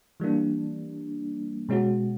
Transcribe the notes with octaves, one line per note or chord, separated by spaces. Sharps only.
E3 G3 A#3 D4
B2 G#3 C#4 F#4